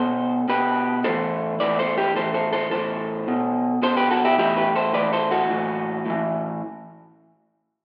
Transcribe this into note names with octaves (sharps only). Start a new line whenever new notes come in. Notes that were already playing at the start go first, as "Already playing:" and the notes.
Already playing: B2 A4 C5
B2 G4 B4
A2 E3 A4 C5
A2 E3 B4 D5
A4 C5
G4 B4
A2 E3 A4 C5
A4 C5
A4 C5
A2 E3 A4 C5
B2
B2 A4 C5
G4 B4
F#4 A4
E4 G4
A2 E3 E4 G4
G4 B4
A4 C5
A2 E3 B4 D5
A4 C5
F#4 A4
A2 E3
A2 E3